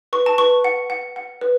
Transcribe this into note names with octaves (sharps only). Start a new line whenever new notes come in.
B4 C#6
A5
B4 C#6
F#5
F#5
F#5
B4